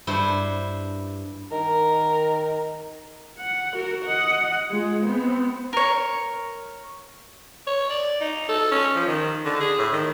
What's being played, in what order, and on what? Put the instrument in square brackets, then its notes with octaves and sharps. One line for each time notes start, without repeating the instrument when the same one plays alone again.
[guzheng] G2 E4 C5
[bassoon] D#3 [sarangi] A#4
[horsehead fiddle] F#5
F#4 A#4
D#5 F#5
G#3 F4
B3 C4
[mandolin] A#4 C#5
[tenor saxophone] C#5
D5
D#4
A4
C#4
F3
D#3
D3
G#4
A2
D#3